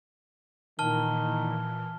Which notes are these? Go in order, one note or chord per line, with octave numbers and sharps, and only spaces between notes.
A#2 D#3 E3 A5 F6 G7